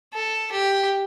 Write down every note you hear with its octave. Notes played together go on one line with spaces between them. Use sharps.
A4
G4